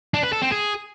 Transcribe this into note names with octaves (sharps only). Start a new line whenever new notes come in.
D4
B4
A4
C4
G#4